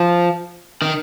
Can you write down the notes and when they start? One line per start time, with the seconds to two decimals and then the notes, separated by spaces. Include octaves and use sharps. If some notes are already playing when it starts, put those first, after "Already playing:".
Already playing: F3
0.82 D#3